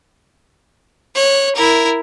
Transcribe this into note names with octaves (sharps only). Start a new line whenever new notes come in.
C#5 F#6
E4 A#4